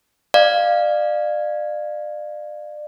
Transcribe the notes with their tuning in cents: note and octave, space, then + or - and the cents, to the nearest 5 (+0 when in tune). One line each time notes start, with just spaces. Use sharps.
D5 +30 F5 +0